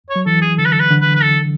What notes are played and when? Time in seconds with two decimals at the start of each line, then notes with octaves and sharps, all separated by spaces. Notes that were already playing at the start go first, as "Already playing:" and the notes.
0.10 C#5
0.16 F#3
0.26 E3 A4
0.42 G#4
0.58 D3 A4
0.66 B4
0.73 A4
0.80 B4
0.91 D3
1.01 B4
1.15 B4
1.23 A4